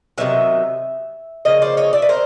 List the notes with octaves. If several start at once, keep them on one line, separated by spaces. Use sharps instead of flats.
C3 D#3 F#3 B3 E5
C#3 F3 A#3 D#5
C5 D5
C#5 D#5
D5 E5
B4
A#4 C5